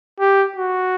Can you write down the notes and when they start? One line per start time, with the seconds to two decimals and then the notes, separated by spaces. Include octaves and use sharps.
0.20 G4
0.56 F#4